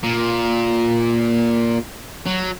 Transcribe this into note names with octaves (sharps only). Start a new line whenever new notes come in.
A#2
F#3